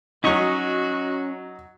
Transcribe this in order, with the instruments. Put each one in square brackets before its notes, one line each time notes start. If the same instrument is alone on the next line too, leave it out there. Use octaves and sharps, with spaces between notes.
[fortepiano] F#3 D#4 [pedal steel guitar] C#4 D#5 C#6 [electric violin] F#4